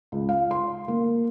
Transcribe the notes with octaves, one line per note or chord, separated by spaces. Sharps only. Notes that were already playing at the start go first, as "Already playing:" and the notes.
C#2
F5
C6
A#3